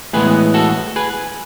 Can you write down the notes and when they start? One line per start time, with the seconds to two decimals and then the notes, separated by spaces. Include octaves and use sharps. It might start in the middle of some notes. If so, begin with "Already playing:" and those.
0.13 A2 E3 G#3 B3 G#4 B4
0.54 F#4 A4
0.96 G#4 B4